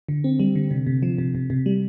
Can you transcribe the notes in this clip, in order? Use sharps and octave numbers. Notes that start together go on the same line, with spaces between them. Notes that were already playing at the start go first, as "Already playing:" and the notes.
D3
C4
G3
D3
C3
C3
F3
C3
C3
C3
G3